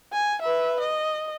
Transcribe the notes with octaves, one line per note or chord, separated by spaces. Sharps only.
G#5
B4 E5
D#5